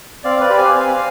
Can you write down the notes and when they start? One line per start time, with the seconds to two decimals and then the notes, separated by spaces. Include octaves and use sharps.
0.24 C4 D5 F5
0.41 B4 D5
0.50 G4 B5
0.57 F5 G#5
0.74 C4 F5 G#5